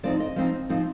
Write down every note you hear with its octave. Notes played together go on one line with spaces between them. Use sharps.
F3 C4 D#4 D5
D#5
F3 C4 D#4
F3 C4 D#4